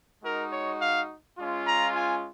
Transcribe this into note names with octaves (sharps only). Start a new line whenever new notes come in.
G#3 D#4 F#4 A#4
C#5
F5
G#3 C#4 F4
A#5
G#5